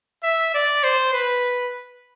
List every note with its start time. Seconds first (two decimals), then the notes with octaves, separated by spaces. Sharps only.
0.24 E5
0.54 D5
0.84 C5
1.14 B4